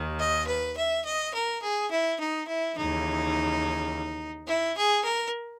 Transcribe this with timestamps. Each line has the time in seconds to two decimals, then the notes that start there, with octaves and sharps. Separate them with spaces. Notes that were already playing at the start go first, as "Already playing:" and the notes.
Already playing: D#2 D#3
0.19 D#5
0.47 B4
0.77 E5
1.04 D#5
1.33 A#4
1.62 G#4
1.90 E4
2.19 D#4
2.48 E4
2.76 D#2 C#3 E3 D#4
4.47 E4
4.76 G#4
5.04 A#4